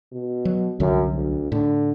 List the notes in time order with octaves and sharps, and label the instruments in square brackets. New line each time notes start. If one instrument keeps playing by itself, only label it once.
[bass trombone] B2
[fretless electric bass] F#3
[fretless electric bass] C2 D3 F#3 [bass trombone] F#2
[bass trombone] D2
[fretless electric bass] A2 [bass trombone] D3